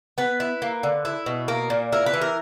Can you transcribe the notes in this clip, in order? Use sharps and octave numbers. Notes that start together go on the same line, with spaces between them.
B3 B4
E4
A#3
D3
E4
B2
A#3 A#4
A#2
E4 A#4
B4
E3
A#4